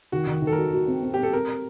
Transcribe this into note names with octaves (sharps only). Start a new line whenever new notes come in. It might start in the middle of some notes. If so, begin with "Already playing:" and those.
D#3 F#4
D#3
D#3
A4
A#4
F#4
F#4
C4
C4
C4 G4
A4
C4 A#4